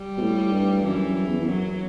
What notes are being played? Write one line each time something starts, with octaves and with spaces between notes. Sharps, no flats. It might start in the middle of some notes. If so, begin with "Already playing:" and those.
Already playing: G3
B2
A2
G2
F#2 E3
F#2
E2
E2
F#2 F#3